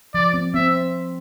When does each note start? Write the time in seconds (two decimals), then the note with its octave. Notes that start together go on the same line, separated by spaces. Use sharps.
0.14 F3 D5
0.34 C4
0.54 C4 E5